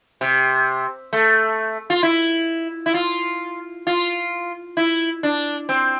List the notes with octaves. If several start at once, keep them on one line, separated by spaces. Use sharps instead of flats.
C3
A3
F4
E4
E4
F4
F4
E4
D4
C4